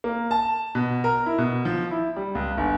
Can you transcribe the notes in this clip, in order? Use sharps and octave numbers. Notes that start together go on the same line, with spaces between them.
A#3
A5
B2
A#4
E4
B2
F3
E4
G3
C#2
G1